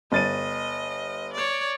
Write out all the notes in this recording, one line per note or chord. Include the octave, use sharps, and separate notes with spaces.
G1 D#5 A6 D#7
C#5 D5